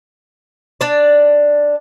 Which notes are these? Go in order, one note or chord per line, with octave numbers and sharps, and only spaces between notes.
D4 D5